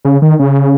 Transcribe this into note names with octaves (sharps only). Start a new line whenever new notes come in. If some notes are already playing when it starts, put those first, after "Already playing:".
C#3
D#3
C#3